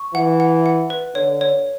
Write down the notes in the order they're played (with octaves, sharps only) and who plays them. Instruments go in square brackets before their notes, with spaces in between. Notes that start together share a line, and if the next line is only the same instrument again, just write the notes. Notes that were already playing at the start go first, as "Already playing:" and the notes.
Already playing: [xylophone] C#6
[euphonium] E3 [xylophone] F#5
[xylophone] F#5
F#5
B4
[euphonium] D3 [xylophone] C#5
[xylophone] C#5